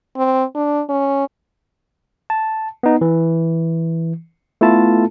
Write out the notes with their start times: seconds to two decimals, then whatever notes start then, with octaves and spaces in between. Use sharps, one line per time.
0.16 C4
0.55 D4
0.89 C#4
2.30 A5
2.83 B3 D#4
3.01 E3
4.61 A3 B3 E4 F4 A4 A5